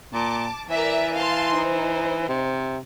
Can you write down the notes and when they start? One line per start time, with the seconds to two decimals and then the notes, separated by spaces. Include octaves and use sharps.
0.13 A#2 A5 D6
0.68 E3 A#4 D5 E5
1.14 F5 A5 C6
1.53 D#4 C5
2.28 C3